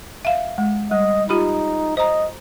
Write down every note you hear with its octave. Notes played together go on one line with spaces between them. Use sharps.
E5 F5
G#3
G3 D#5
D#4 F4 G4 B5
C5 D#5 A#5